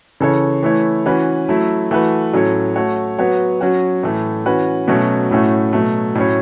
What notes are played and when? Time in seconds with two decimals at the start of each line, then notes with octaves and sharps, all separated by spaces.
0.20 C#3 E3 C#4 A4 C#5
0.63 E3 A3 E4 C#5
1.06 E3 C#4 F#4 B4
1.49 F#3 A3 E4
1.91 E3 A3 F#4 B4
2.33 A2 F#3 C#4 A4 C#5
2.76 A3 F#4 C#5
3.19 F#3 B3 F#4 C#5
3.61 F#3 C#4 F#4
4.03 A2 E3 A3
4.45 E3 C#4 F#4 B4
4.88 B2 F#3 A3 C#4
5.31 A2 A3 C#4 F#4
5.73 B2 F#3 A3
6.15 A2 F#3 C#4 E4 C#5